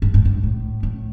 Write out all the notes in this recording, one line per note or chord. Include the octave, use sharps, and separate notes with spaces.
G2
G#2
G2
A2
A2